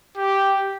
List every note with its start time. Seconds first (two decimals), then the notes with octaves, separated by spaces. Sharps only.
0.18 G4